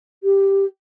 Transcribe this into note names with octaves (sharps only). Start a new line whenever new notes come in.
G4